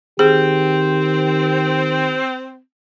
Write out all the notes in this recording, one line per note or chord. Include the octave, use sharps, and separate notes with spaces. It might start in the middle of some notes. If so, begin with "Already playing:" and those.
D#3 C4 G4 G#4